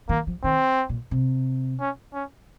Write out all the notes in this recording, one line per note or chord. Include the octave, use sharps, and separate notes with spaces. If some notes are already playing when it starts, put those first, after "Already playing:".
D#3 A#3
F3
D#3 C4
A#2
C3
C#4
C#4